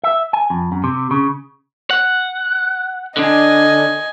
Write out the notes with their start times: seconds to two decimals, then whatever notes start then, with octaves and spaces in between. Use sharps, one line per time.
0.04 E5
0.33 G#5
0.50 F2
0.72 F#2
0.84 C3
1.11 C#3
1.90 F#5
3.17 D3 D4 D#5 G#5